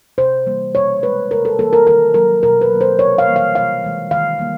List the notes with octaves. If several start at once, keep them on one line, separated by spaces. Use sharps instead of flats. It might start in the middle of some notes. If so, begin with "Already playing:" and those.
C3 C5
E3 G3 A#3
B2 C#5
G#3 B4
C3 A#4
A4
E3 G3 A#3 A4
A#4
D#3 A#4
F#3 A#3 A#4
B2 A#4
B4
F#3 A#3
C5
C3 C#5
F5
E3 G3 A#3
F5
C3 F5
E3 G#3
D#3 F5
G3 A#3